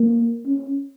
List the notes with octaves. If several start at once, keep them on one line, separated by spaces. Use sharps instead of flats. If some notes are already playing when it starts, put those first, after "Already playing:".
Already playing: A#3
C#4